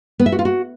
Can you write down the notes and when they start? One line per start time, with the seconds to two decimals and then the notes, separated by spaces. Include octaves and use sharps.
0.20 B3
0.26 E5
0.32 F#4
0.39 F4
0.45 F#4